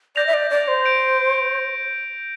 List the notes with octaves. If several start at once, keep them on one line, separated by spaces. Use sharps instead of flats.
D5 G6 A#6 F7
E5
D5
D5
C5
G6 D7 F7